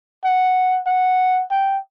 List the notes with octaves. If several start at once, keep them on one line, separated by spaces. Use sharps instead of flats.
F#5
F#5
G5